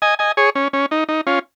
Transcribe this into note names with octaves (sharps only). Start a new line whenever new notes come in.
D#5 G#5
D#5 G#5
G#4 C#5
C#4
C#4
D#4
D#4
C#4 F4